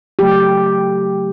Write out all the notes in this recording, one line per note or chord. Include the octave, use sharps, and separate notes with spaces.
C#3 F#3 A3 G4